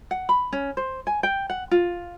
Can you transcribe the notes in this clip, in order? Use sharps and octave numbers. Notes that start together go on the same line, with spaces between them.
F#5
B5
C#4
C5
G#5
G5
F#5
F4